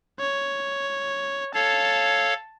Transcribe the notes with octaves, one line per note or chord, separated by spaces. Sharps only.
C#5
A4 C#5 F5 A5